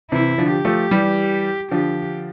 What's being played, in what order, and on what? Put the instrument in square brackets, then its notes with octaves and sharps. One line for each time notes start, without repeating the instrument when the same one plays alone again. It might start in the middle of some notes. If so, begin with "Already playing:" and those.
[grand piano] C3 E3 [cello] E4
[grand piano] D3 F3
[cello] G4
[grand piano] F3 A3
E3 G3
[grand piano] D3 F3 [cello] G4